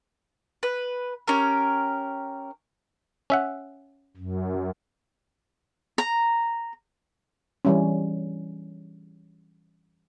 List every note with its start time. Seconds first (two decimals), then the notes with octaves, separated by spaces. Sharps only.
0.63 B4
1.27 C#4 G4 A#4
3.30 C#4 E5 F#5
4.17 F#2
5.98 A#5
7.65 E3 G3 C#4